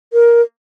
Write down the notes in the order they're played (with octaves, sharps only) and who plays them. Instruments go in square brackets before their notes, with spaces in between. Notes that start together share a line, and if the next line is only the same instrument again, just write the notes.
[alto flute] A#4